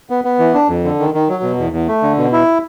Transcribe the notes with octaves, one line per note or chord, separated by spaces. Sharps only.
B3
B3
E3
D4
F2
D3
D#3
D#3
F#3
B2
E2
E2
A3
D3
B2
E4